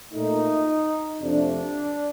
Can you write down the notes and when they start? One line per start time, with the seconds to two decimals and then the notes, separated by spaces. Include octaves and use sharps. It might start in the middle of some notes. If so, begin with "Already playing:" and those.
0.13 A#2 A3 D#4
1.21 F2 C3 F3 A3 D4